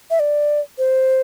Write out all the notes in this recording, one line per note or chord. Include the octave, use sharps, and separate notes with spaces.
E5
D5
C5